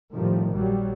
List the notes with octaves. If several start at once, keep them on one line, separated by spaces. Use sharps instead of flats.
A2 D#3 F3 G3
A#1 F#3 G3